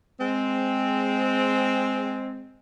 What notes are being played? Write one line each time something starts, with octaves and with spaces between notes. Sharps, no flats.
G#3 C4